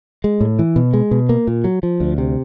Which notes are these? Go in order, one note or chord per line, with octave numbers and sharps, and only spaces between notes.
G#3
A2
E3
B2
G#3
B2
A#3
A#2
F#3
F3
D2
C3